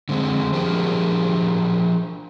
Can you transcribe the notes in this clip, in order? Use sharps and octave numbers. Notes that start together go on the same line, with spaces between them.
D3 G#3 C4
F3 D4 G4 G#4 A#4